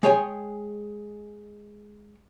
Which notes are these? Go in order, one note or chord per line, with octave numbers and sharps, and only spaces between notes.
G#3 G#4 C#5 G5 G#5